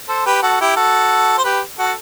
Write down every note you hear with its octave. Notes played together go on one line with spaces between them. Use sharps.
A4 C5
G4 B4
F#4 A4
E4 G4
F#4 A4
C5
G4 B4
F#4 A4